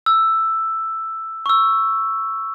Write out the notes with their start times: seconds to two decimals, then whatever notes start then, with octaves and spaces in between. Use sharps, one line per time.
0.06 E6
1.46 C#6 E6